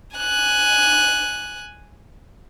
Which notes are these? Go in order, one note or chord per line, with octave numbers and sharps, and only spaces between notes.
G#5 F#6